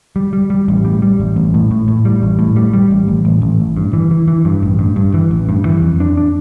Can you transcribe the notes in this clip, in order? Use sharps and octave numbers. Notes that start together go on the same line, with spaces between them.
G3
G3
G3
A1
G3
G3
A1
A1
A2
A2
A2
G3
A1
A2
G3
G3
A1
A1
A1
A1
A1
G2
E3
E3
E3
G2
A1
G2
G2
E3
A1
G2
E3
F2
D4
D4